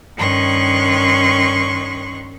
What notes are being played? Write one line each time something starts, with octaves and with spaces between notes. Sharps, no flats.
G2 D#3 C#4 C6 C#6 F#6